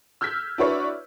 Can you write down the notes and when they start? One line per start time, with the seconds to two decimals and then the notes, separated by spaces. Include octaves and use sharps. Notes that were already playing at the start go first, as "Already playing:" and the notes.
0.21 E6 F6 G6 G#6 B6
0.58 D4 E4 F#4 B4 C#5 D5